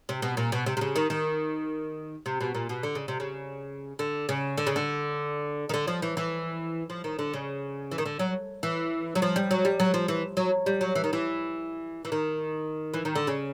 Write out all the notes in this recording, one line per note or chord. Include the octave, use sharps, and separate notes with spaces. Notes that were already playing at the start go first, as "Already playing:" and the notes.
C3
B2
A#2
B2
C3
C3
C#3
D#3
D#3
C3
B2
A#2
B2
D3
C#3
C3
C#3
D3
C#3
D3
C#3
D3
D#3
D3
F3
E3
E3
F3
D#3
D3
C#3
E3
D#3
D3
F#3
E3
F#3
F3
G3
F#3
G3
F#3
F3
E3
F#3
G3
F#3
E3
D#3
E3
E3
D#3
E3
D#3
D3
C#3